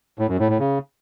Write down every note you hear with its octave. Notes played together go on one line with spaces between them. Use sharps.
A2
F#2
A2
A2
C#3